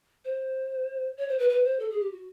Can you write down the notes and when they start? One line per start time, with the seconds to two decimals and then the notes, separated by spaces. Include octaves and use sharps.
0.25 C5
1.17 C#5
1.29 C5
1.39 B4
1.49 B4
1.64 C5
1.80 A4
1.90 G#4
2.00 G4
2.11 F#4